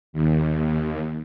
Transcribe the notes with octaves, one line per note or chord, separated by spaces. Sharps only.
D#2